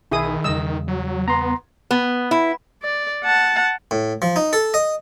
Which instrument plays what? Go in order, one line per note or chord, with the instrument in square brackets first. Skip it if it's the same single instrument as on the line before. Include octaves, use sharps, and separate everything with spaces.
[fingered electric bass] B1 [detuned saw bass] D#3 [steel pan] E4 G#4 D#6
[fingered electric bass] E2 C#3 G3 [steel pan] D#5 E6
[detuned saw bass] F#3
[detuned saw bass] B3 [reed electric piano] A#5 C6
[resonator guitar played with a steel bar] B3
E4
[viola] D5
F#5 A5
[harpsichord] A2
F3
D#4
A4
D#5